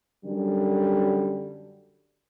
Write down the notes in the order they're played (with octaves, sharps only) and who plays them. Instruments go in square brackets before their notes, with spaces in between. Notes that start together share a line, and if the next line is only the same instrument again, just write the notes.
[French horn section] F#2 D3 G3